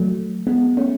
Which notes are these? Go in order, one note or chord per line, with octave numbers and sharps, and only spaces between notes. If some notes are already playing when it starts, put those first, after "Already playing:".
Already playing: F#3 A3
G#3 B3
A3 C#4